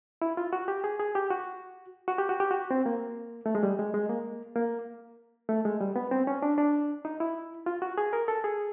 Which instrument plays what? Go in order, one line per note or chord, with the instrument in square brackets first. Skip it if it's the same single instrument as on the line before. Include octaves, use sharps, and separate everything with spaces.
[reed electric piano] E4
F4
F#4
G4
G#4
G#4
G4
F#4
F#4
G4
F#4
G4
F#4
C4
A#3
A3
G#3
G3
G#3
G#3
A#3
A#3
A3
G#3
G3
B3
C4
C#4
D4
D4
D#4
E4
F4
F#4
G#4
A#4
A4
G#4